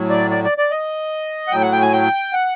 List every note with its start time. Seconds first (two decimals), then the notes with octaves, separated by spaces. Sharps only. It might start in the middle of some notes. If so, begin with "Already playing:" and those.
Already playing: A2 F#3
0.10 D5
0.31 D5
0.44 D5
0.58 D5
0.71 D#5
1.47 F#5
1.52 A2 F#3 G5
1.62 F#5
1.72 G5
1.82 G#5
1.93 G5
2.33 F#5